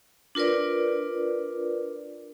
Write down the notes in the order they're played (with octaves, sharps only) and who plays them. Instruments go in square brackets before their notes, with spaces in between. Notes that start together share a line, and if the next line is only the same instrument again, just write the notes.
[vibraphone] D4 F4 A#4 B4 D5